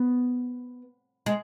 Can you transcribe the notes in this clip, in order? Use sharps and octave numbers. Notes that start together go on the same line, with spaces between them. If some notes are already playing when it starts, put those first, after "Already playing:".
Already playing: B3
G#3